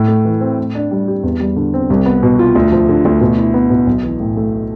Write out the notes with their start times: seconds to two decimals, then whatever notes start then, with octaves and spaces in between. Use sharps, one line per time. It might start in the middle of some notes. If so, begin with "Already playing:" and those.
Already playing: A2
0.08 A3
0.25 E3
0.41 C4
0.58 A2
0.75 D4
0.91 G3
1.08 G4
1.23 E2
1.40 G3
1.56 D3
1.74 C4
1.90 C2
2.06 B3
2.23 B2
2.39 F4
2.55 D2
2.72 F3
2.89 D3
3.05 D2
3.21 B2
3.38 E4
3.54 B3
3.70 B2
3.87 B1
4.03 E3
4.20 A2
4.37 A3